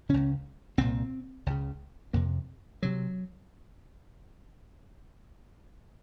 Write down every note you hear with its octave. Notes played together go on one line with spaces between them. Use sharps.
C#2 C#3 C#4
C2 A#2 C4
C#2 C#3
F2 C3 A#3
C3 F#3